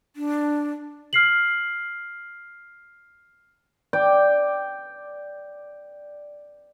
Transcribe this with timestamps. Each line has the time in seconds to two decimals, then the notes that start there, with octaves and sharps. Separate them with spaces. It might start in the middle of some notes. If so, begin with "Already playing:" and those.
0.16 D4
1.13 F6 C7 F#7
3.93 D5 G5